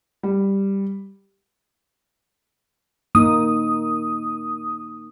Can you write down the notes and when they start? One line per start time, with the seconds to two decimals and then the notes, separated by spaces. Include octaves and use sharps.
0.23 G3
3.15 A#3 D#4 D#6